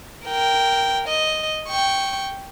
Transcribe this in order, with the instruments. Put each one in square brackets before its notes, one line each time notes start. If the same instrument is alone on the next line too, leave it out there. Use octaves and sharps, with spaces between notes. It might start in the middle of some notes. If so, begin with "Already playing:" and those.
[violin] A#4 G5
D#5
G5 C#6